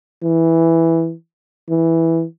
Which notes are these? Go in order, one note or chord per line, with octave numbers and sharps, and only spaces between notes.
E3
E3